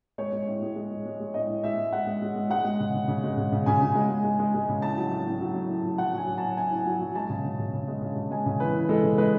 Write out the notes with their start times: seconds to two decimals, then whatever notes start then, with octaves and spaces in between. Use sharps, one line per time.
0.18 G#3 C#5
0.33 G#3
0.47 A2
0.62 G#3
0.76 G#3
0.91 G#3
1.05 G#3
1.20 G#3
1.34 A2 D#5
1.48 A2
1.64 G#3 E5
1.77 G#3
1.92 G#3 F#5
2.07 G#3
2.22 G#3
2.36 G#3
2.50 G#3 F#5
2.64 G#3
2.80 C#3
2.94 C#3
3.08 C#3
3.24 G#3
3.37 C#3
3.52 C#3
3.66 C#3 G#5
3.82 C#3
3.95 G#3
4.10 G#3
4.24 G#3
4.39 G#3
4.54 G#3
4.69 C#3
4.82 A2 A5
4.97 F#3
5.11 A2
5.27 A2
5.41 F#3
5.55 A2
5.69 A2
5.84 F#3
5.98 F#3 F#5
6.13 F#3 G#5
6.27 F#3
6.38 A2 A5
6.57 A2 G#5
6.71 A2
6.86 F#3
7.00 F#3
7.15 G#3 A5
7.30 C#3
7.44 C#3
7.59 C#3
7.73 C#3
7.88 G#3
8.02 C#3
8.16 C#3
8.31 G#3 G#5
8.46 C#3
8.60 E3 B4
8.75 E3
8.89 G#3 A4
9.03 C#3
9.18 G#3 B4